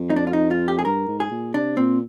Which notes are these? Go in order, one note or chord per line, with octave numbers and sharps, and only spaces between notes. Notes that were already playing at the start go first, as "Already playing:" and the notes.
Already playing: F2
D#4
D4
F4
D#4
F4
G4
G#4
G2 A#4
G#2
G#4
A#2
C3 D4
A#2 C4